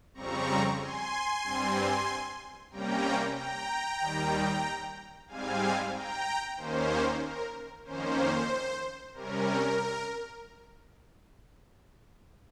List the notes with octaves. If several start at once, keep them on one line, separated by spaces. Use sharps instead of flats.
F2 C#3 G3 C4 A#5 C#6
G#5 C6
G2 G3 C4
C3 G3 A#3 C#4 G5 A#5
G5 A#5
D#2 D#3 G3
G#2 G3 C4 F5 G#5
G5 A#5
D#2 D#3 A#3 C#4 C5
A#4
F2 D#3 A#3 C#4 C5
C3 G3 C#4 A#4